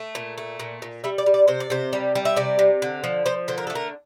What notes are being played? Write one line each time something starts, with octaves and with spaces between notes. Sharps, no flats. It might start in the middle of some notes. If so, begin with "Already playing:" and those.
Already playing: A3
A#2
A3
A#2
A#2
G3 E5
D5
G3
D5
C3 C5
D5
C3 C5
G3
G3
E5
C3 D5
C3
D3
F3
F3 C5
D3 C5
A#4
A3 A4
A#4